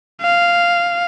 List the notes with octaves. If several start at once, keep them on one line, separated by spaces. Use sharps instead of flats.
F5